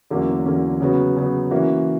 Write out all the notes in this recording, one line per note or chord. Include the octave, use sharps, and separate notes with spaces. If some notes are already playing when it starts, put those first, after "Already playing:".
E2 D3 F#3 A#3 C#4
E2 D3 F#3 A#3 C#4
C#3 F#3 B3 F#4
C#3 F#3 B3 F#4
E3 A#3 C#4 F#4